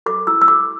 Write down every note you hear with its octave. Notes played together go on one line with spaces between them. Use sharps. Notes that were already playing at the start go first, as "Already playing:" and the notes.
A4 D6
E4 E6
E6
A4 D6